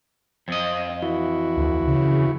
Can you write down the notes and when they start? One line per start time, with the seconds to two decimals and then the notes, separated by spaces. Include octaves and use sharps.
0.48 F2 C4 D#5
1.02 E3 E4 F#4
1.57 D2
1.88 C#3